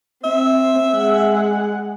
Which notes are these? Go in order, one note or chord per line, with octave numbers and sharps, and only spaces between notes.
C4 E5
G#3 F#5